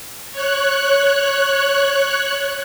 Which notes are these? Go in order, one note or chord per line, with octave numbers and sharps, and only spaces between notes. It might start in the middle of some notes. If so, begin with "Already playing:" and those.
C#5 F#6